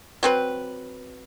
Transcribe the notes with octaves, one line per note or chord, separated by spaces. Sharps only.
F#3 C4 B4